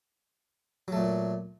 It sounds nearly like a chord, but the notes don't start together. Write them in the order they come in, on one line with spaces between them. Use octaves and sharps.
F#3 A3 A#2